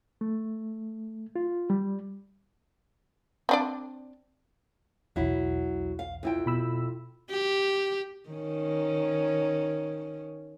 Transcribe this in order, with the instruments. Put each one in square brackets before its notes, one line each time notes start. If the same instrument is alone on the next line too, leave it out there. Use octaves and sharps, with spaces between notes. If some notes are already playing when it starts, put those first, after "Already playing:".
[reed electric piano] A3
F4
G3
[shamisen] C4 D4 D5
[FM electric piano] B1 E2 [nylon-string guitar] F#3 E4
[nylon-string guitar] F5
F2 E4 G5
[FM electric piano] B2 B5 E6
[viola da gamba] G4
D#3 C#4